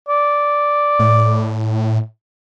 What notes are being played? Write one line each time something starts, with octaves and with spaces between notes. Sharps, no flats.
D5
A2